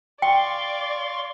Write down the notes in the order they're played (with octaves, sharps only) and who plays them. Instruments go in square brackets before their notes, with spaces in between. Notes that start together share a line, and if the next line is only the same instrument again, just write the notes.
[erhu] D5 [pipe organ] F5 C6 C#6 [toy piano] G5